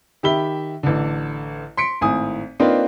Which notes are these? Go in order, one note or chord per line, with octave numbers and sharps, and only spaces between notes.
D#3 G4 E5 B5 G7
A1 D3
C6 B6 C#7 D7
G#1 A2 G#5 D#6
A#3 C4 D4 D#4 F4 B4